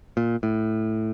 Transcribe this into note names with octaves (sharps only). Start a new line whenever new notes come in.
A#2
A2